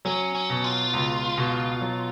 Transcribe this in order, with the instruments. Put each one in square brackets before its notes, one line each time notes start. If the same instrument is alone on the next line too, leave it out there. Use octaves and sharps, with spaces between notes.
[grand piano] F#3 [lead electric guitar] C#4
[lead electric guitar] C#4
[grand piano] B2
[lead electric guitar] F4
[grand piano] C#2
B2
F#3